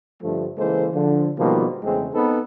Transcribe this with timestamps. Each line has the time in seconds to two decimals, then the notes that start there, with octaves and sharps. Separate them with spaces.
0.22 G2 D3 F3 A3
0.58 C#3 E3 G#3 A#3 A4 C5
0.93 D3 F3
1.38 B2 D#3 F3 G3 G#3 A#3
1.83 E2 C#3 G#3 A3 C4
2.13 B3 C4 D#4 A4 B4